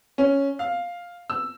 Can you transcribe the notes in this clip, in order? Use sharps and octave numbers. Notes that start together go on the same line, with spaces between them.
C#4
F5
E6